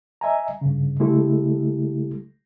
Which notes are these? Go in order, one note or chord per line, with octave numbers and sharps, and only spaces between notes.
D#5 E5 G#5 A#5
G2 C#3
C#3 G#3 A3 E4 G4 A4